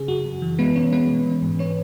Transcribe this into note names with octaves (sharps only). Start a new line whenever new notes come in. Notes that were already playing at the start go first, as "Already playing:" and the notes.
Already playing: C#3 G#4
F#2 F#4
F#2
E3
G#3 B3 B4
B2 C#4 C#5
G#3 B3 B4
B2
E3
G#2
C#4 C#5